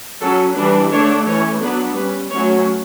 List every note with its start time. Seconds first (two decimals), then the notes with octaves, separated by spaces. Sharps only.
0.21 F#3 C#4 A4
0.56 E3 G3 D4 B4
0.91 D3 A3 D4 C#5
1.26 E3 A3 C#4 C#5
1.61 F#3 B3 D4 B4
1.96 G3 C#4 B4
2.31 F#3 A3 C#4 C#5